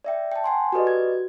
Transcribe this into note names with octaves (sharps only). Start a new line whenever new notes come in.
D5 E5 G5
G5 A5
F#5 G#5 C6
F#4 G4 A4 B4 D5 D#5
F#4 G#6